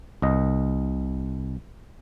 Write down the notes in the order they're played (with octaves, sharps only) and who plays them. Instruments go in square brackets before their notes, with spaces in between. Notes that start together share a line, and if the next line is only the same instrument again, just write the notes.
[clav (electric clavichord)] C2 D#5